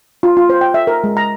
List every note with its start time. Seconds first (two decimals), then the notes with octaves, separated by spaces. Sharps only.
0.23 F4
0.37 F4
0.50 C5
0.61 G5
0.74 E5
0.87 A#4
1.04 G#3
1.17 A#5